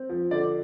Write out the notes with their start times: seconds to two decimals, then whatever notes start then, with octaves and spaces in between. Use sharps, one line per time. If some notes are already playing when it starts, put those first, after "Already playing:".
Already playing: C4
0.10 F3
0.31 D3 D5